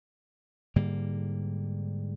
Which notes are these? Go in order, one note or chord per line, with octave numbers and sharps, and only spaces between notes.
G#2 D3 G3 A#3